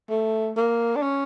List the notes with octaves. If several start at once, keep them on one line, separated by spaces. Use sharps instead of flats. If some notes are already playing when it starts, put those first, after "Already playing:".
A3
A#3
D4
C#4